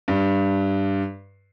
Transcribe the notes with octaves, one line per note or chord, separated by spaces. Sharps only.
G2